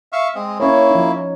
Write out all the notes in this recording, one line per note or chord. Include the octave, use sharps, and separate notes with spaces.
E5 F5 C#6
G#3 C4 D#5
A#3 C#4 E4 C#5
F3 D#4